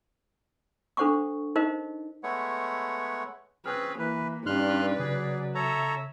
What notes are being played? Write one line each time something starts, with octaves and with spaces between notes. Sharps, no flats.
D4 A4 C5 F#5 C#6 D6
D#4 A#4 C5 D#5 F5
G#3 A3 B3 C#5 F#5
C4 C#4 G#4 B4 F6 F#6
E3 A#3 B4
G2 C#4 D#4 B4 D5 C6 F6 F#6
C#3 F#3 G#4
A4 C#5 E5 A#5